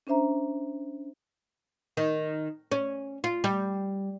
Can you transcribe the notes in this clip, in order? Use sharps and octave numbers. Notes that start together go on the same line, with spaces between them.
C#4 D4 C5 E5 A#5
D#3
C#4
F4
G3